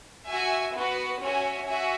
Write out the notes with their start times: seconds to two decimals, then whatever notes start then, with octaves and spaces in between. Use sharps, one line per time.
0.27 F#4 E5 G#5
0.74 B3 F#4 B4
1.20 C#4 F#4 C#5 E5 G#5
1.65 F#4 E5 G#5